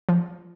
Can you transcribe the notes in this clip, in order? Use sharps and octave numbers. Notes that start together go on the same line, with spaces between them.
F3